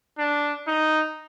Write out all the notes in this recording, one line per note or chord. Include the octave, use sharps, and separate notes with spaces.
D4
D#4